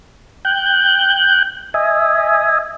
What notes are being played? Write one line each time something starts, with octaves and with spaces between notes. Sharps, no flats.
G5 F#6 G6
D#5 E5 G#5